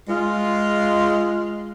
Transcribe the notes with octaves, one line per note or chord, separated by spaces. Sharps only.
G#3 F4